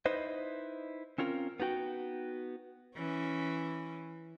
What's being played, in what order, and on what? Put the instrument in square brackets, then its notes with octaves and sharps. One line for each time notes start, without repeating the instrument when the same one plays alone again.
[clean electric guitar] D#4 E4 B4 C5 D#5
C4 C#4 F4 A#4
B3 D#4 F#4 G5
[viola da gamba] E3 C#4